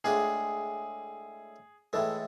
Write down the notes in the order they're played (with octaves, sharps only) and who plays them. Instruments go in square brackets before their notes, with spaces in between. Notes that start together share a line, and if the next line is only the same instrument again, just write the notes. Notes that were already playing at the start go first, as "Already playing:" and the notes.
[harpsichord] A2 G#3 D4 F4 [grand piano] G#4
[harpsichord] A2 E3 G#3 [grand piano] A4